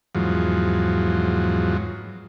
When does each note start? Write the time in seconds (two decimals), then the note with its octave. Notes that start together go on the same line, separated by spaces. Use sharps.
0.15 E2 G#2 F3 F#3